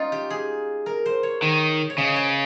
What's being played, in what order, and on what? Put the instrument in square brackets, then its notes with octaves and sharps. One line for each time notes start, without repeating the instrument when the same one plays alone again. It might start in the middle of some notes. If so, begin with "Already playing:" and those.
Already playing: [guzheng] C#4 D#4 F4
G4
G#4
A#4
C5
C#5
[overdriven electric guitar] D#3 [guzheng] C#5
[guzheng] C#5
[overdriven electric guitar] C#3 [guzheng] D#5
[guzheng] C#5